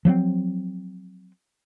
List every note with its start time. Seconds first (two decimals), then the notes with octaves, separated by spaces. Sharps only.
0.05 F3 F#3 B3 C4